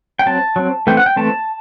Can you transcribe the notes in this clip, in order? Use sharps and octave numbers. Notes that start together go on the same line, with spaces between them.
G5
F#3 C4 A5
F#3 C4
E3 A3 C4 G5
F#5
G5
E3 A3 C4 A5